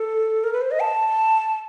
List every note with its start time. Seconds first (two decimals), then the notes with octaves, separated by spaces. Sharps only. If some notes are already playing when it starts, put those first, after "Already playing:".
Already playing: A4
0.44 A#4
0.53 B4
0.61 C5
0.71 D#5
0.80 A5